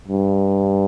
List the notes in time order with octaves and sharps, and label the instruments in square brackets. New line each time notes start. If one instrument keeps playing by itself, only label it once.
[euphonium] G2